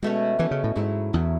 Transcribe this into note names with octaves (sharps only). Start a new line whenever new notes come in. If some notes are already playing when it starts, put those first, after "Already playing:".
B2 G#3 A3 C#4
B2 E3 A3 C#4
C#3
A2
G#2 F#3 A3 E4
E2 F#3 A3 E4